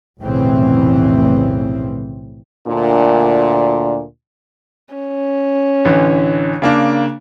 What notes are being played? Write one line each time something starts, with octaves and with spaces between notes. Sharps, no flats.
F1 B1 A2 C#3 E3 C4
D2 A#2 D4
C#4
A1 D3 E3
C#3 A#3 D4